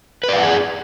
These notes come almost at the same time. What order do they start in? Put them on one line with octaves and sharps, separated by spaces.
B4 D5 F5 F#5 G#4